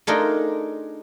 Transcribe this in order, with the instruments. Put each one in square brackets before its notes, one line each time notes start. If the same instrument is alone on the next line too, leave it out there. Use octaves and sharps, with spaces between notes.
[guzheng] A3 D4 D#4 F4 G#4 A#4